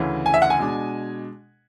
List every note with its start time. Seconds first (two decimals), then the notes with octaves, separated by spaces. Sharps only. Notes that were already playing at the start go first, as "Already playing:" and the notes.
Already playing: D2 C#3 E3
0.26 G#5
0.34 E5
0.42 F#5
0.50 G#5
0.59 B2 G#3 D4